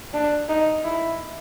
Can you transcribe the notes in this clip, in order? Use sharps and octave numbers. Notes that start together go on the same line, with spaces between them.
D4
D#4
E4